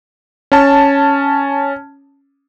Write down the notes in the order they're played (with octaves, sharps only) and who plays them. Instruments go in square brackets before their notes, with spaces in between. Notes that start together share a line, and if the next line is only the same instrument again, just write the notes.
[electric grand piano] C#4 A5